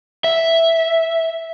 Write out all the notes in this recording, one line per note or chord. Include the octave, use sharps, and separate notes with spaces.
E5